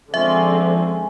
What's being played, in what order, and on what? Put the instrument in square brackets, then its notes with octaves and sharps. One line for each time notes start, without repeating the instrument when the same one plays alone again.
[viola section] D3 C4 G#4 [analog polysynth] F3 [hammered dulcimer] G#3 C#4 [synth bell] E5